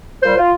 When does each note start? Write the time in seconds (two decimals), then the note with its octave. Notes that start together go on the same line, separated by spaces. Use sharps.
0.23 A#2 G3 C5
0.37 F4